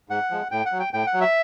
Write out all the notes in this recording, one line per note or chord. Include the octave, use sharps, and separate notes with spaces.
G#2 F#5
F3 G#3
A2 G5
F#5
F#3
G5
A2 G5
F#5
F#3
E5